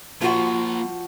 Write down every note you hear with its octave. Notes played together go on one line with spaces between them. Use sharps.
F3 A#3 F4 F#4 C5